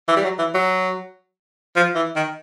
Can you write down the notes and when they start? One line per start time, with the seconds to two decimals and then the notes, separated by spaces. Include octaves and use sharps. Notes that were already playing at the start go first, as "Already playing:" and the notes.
0.08 E3
0.16 G3
0.24 F#3
0.39 E3
0.54 F#3
1.76 F3
1.95 E3
2.16 D#3